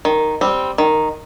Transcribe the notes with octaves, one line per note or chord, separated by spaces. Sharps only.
D#3
G3 C4
D#3